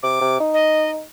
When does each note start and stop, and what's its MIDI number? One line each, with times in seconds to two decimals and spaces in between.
0.03 0.19 48
0.03 0.37 86
0.21 0.39 48
0.40 1.02 63
0.54 0.90 75